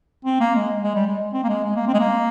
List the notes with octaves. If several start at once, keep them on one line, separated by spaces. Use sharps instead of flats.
C4
A#3
G#3
G#3
G3
G#3
C4
A#3
G#3
G#3
A#3
C4
G#3
A#3